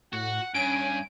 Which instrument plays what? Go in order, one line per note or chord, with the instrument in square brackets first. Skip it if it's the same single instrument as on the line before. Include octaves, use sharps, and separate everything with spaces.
[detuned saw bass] A2 [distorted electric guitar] F#4 [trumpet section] F#5
[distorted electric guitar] G2 [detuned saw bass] C#4 [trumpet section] G#5 [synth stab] D7